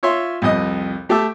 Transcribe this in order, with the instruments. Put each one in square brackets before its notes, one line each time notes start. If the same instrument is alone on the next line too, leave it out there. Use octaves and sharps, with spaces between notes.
[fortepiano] F4 C#5 E5 C6
C2 F2 D#5 D#6
A3 G4 A4 E5 D6 E6